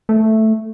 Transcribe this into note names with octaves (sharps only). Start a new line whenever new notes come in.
A3